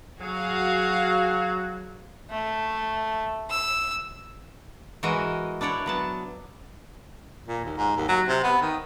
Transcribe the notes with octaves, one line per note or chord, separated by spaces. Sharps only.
F#3 F#4 G#4 F5
A3
E6
E3 G#3 F#4 A#4 D#5 E5
D4 E4 C#5 D5 F#5
F#3 B3 A5
A#2
D#2
G#2
D#2
F#3
C3
B3
D#3